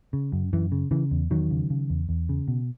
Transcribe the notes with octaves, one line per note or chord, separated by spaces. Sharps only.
C#3
F#2
F#2 E3
C#3
C#3 E3
E2
E2 D#3 F#3
C#3
C#3
E2
E2
C#3
B2